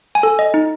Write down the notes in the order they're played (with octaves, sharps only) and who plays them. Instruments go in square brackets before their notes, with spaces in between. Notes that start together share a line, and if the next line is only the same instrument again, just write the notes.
[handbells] G#5
A4
D#5
D#4